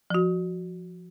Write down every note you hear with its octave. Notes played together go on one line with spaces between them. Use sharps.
F3 F#4